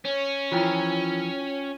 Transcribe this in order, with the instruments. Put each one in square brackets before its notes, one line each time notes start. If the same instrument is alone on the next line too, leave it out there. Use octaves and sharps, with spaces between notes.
[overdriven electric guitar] C#4
[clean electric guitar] E3 F3 A#4 [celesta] F4 G5